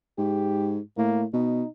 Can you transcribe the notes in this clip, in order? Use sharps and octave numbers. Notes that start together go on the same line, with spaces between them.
G#2 G4
A2 A#3
B2 D#4